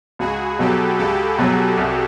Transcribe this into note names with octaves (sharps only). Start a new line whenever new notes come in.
C#2 F#4 G#4
B2 F#3 G4 A4
C#2 G4 A4
B2 F#3 F#4 G#4
C2